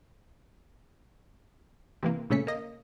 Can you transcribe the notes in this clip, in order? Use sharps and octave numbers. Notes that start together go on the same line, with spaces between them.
C3 E3 A#3
A#2 C#3 A3 C#4 B6 C#7
A#3 D#5